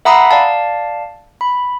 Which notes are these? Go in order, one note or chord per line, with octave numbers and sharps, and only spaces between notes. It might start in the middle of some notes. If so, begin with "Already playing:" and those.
E5 F#5 A#5 B5 D#6 C7
D5 F5 A5
B5